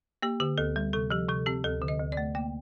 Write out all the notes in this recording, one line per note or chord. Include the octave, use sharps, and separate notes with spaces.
A#3 G4
D3 G4
D2 A4
G3
C3 A4
F3 G4
C3 A4
C4 G4
D2 A4
D3
D#5
D2
D5
A3
A#3 G5